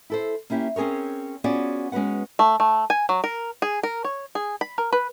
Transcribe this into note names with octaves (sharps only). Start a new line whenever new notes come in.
E4 A4 C5
A#3 C#4 E4 G4
C4 C#4 G#4 A#4 C#5
B3 C#4 F4 F#4 G#4 D5
G#3 C#4 F#4 B4 F#5
A3
A3
G#5
F#3
A#4
G#4
A#4
C#5
G#4
B5
A#4
B4